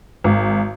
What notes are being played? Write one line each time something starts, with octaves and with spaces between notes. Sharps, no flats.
G#1